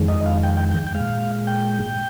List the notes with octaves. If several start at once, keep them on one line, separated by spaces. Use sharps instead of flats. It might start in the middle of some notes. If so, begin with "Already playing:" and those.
Already playing: F2 D#3 G#3
D#5
F5
G5
G5
G5
G5
G#3 F5
A#2
G5